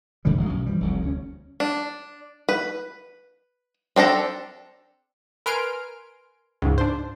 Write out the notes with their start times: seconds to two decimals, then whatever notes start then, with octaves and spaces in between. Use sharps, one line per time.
0.25 G#2 D3 E3 G3
0.37 A1 F#3 G#3
0.49 B1 F#2
0.66 E3 F3 G3
0.80 F1 C2 F2
1.02 D2 C#4
1.60 D4
2.49 B4
3.96 C4 D4 A4 A#5
5.46 A#4 B4 G#5 C6 F6 D7
6.62 C#2 G#2
6.78 D4 C5